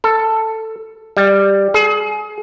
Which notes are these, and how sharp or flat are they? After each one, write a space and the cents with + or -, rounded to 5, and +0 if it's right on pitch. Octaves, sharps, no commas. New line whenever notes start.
A4 +10
G3 +5
G#4 +30